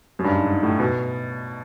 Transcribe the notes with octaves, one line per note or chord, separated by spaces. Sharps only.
F#2
G2
G#2
G#2
A2
B2